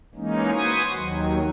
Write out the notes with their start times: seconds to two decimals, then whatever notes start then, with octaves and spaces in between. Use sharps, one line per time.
0.15 E3 G#3 A#3 C#4 D#4
0.52 F#4 B4 C5 G#5 C#6 D#6
0.95 D#2 D#3 F#3